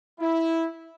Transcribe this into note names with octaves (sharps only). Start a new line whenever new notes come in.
E4